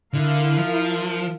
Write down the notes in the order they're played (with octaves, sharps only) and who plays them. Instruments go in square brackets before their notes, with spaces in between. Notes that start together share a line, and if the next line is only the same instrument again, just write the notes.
[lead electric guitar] D3 [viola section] E4 A#4 F5
[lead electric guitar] F3